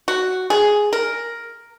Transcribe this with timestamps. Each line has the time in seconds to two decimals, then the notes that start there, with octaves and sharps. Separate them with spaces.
0.08 F#4
0.50 G#4
0.93 A#4